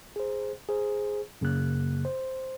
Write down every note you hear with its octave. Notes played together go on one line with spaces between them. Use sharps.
G#4 C5
G#4 C5
F#2 C#3 A#3 F#6
C5